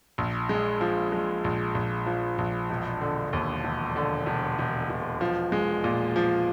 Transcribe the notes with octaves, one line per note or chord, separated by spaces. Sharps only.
A#1
G#3
F3
G#3
A#1
A#1
F3
A#1
E1
D3
D#2
E1
D3
E1
E1
E1
F3
G#3
A#2
F3